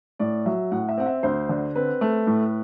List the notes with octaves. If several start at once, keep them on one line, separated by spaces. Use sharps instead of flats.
A2 D5
F#3 E5
A2 F#5
E5
C4 F#5
E5
D2 C5
D3
C4 B4
A3
A2